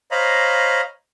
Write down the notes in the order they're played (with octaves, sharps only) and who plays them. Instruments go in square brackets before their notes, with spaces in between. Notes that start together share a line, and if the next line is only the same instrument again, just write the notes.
[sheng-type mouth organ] C5 C#5 D#5 F5 A#5 B5